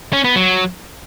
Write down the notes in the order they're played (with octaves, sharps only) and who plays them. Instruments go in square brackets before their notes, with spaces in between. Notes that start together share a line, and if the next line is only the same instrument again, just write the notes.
[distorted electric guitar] C#4
B3
F#3